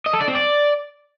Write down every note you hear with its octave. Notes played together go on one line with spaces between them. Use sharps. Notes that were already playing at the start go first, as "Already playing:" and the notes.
D#5
A4
D5
C4
D5